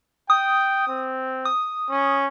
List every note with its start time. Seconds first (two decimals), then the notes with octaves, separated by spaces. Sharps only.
0.30 G5 D#6
0.88 C4
1.45 D#6
1.90 C#4